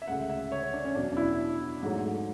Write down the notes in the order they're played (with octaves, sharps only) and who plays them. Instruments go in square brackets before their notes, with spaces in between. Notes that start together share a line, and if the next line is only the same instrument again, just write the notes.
[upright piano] E5
D2 C#3 G#3 F#5
E5
C#5
C#5
D4
C#4
E2 B2 F#3 D4
D4
E4
G#2 F#3 A3